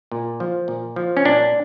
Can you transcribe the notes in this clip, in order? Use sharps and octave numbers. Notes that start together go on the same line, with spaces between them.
A#2
F3
A#2
F3
C#4
A#2 D4